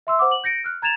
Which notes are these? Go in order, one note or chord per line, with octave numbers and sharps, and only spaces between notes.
E5 C6 E6
C5 F#5 D6
F#7
G6 A#6 C#7 D7
F6 F#6
A#5 G#6 A6 E7 F7